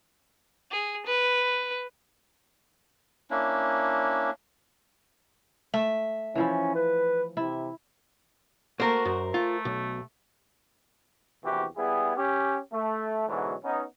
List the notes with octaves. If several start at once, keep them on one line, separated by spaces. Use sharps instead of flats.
G#4
B4
A#3 C#4 D4 E4
A3 E5
E3 F3 C#4 E4
B4
C3 E4
A3 A#3 F#4 A#4 C5
F#2
A3 F4
B1
A#1 E2 C3 E3 F#4 G4
G3 B3 E4 G#4
C#4 G4
A3
G#2 B2 D3 E3 F#3 G#3
B3 C#4 D#4